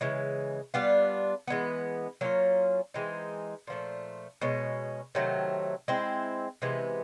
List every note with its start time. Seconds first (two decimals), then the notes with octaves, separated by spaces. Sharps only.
0.01 C#3 E3 G#3
0.74 G3 B3 D4 F4
1.47 E3 G#3 B3
2.21 F#3 A#3 C#4 F4
2.94 E3 G#3 C4 D#4
3.67 A#2 F3 A3
4.41 B2 G#3 C#4
5.15 C3 D#3 F#3 A3
5.88 G#3 C4 E4
6.62 C3 E3 G#3 B3